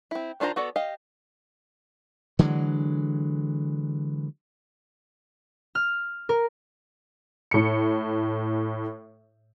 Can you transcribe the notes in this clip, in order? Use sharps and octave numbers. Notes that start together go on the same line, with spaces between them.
C4 E4
D#3 D4 F4 C5 A#5
B3 F#4 A4 D5
G4 D#5 F5
D3 E3 F#3 G#3
F6
A#4
A2 C#7